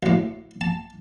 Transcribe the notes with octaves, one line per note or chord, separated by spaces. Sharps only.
D2 A2
A5